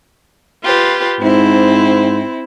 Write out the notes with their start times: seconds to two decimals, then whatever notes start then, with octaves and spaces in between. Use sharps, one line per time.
0.64 F4 G4 B4
1.21 G#2 C4 E4